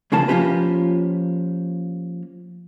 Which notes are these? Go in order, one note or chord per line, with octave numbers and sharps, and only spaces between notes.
C#2 C#3 F3 A#3 A5
F3 A#3 C#4 F4 G4 B4